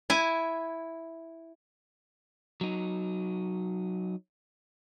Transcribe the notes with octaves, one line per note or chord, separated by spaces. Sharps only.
E4 G#5
F#3 D#4